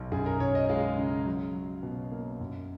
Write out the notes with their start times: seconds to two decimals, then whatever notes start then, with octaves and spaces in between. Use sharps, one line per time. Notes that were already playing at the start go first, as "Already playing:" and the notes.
Already playing: B1
0.12 F#2 G#4
0.26 A#4
0.40 F#2 C#5
0.55 D#5
0.69 G#3 F5
0.97 C#3
1.26 F#3
1.54 F#3
1.83 B2
2.11 A#3
2.40 F#2